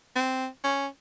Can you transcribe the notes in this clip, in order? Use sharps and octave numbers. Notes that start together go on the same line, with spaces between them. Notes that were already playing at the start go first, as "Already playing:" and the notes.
C4
C#4